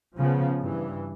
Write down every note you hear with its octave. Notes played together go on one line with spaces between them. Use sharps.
C#3 F3 B3
G2 E3